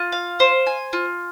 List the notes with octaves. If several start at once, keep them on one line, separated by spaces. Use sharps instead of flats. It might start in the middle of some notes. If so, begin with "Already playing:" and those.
Already playing: F4
F5
C5
G#5
F4